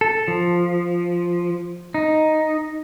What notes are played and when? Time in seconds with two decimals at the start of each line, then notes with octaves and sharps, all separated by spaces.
0.01 A4
0.28 F3
1.94 D#4